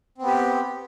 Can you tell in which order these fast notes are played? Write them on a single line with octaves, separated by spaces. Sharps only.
C4 B3 G4